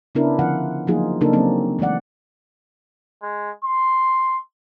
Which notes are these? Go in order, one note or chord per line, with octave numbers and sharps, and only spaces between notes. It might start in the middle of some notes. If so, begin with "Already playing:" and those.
C#3 B3 C#4 D4 E4 A#4
D3 F3 F4 F5 F#5
F3 F#3 A#3 D#4 F4 G#4
C#3 A#3 D4 D#4 A4 A#4
F#3 A#3 C4 C#4
E3 G#3 A3 D5 F#5
G#3
C6